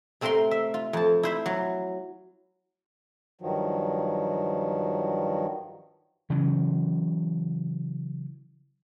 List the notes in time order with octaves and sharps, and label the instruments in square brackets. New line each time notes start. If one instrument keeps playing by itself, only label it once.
[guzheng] C3 A3 C4 A#4 F5 C6
E5
F4
F2 A5
E4 C5 E5
F#3
[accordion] G2 D#3 F3 F#3
[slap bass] C#3 E3 F#3